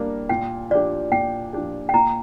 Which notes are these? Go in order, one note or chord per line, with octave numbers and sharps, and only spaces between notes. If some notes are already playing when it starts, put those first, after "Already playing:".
Already playing: G3 A#3 D4 A#4
A#2 G5
F3 D4 G4 D5
A#2 G5
F3 D4 G4
G5
A#2 A#5